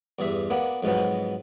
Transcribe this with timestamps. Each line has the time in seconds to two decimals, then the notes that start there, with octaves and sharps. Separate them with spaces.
0.19 E2 G2 G#4 E5
0.50 A#3 B3 D4
0.83 F2 G#2 B2 F#3 B3